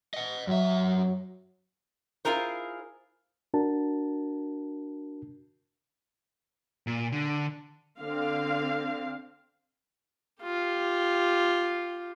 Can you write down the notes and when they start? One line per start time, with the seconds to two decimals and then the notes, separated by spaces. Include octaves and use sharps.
0.14 D#5 F#5
0.47 F#2 F#3 E5
2.25 E4 F4 G#4 A#4 C5
3.54 D4 F#4 A#4 A5
6.87 A#2
7.12 D3
8.01 D3 C4 F5
10.43 F4 G4